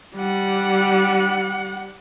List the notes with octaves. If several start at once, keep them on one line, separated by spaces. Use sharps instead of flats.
G3 F#5